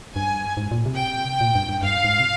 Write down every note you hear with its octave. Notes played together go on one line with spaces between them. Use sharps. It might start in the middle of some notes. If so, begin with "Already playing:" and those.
G2 G#5
G#2
A#2
C3
G5
A#2
G2
G2
G2 F5
G#2
C3